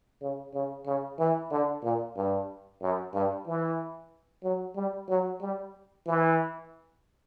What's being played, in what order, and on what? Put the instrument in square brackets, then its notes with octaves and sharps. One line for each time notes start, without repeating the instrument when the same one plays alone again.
[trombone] C#3
C#3
C#3
E3
D3
A#2
G2
F#2
G2
E3
F#3
G3
F#3
G3
E3